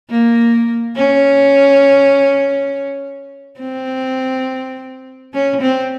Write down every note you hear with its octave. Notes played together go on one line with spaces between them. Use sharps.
A#3
C#4
C4
C#4
C4